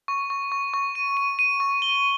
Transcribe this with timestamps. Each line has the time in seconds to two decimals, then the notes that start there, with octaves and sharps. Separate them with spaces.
0.08 C#6
0.30 C#6
0.52 C#6
0.74 C#6
0.95 D#7
1.17 D#7
1.39 D#7
1.60 C#6
1.82 G7